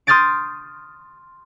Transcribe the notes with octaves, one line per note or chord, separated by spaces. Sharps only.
C6 D#6 F6 G6 A6 D7